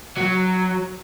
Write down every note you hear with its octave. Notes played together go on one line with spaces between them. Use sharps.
F#3